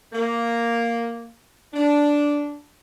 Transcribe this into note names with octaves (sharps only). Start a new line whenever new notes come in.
A#3
D4